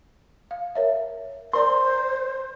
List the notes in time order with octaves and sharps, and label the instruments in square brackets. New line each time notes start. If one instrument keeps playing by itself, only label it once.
[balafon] F5
A#4 C#5 E5
[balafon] A#4 D5 A#5 [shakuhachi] C5 [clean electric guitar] C6